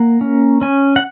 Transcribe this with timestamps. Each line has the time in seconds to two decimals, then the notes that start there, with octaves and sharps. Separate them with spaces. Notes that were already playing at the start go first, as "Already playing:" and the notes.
Already playing: A#3 F#5
0.21 C#4
0.61 C#4 G#5
0.96 F#5